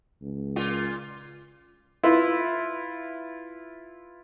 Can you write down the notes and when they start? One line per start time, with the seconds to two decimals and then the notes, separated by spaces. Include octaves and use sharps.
0.22 C#2
0.56 A#2 F4
2.03 E4 F4 B4